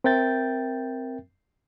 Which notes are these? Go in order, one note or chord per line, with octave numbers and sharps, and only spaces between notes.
C4 A#4 E5 G5 G6 A6